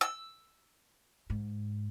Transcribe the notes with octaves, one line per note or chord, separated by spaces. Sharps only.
E6
G#2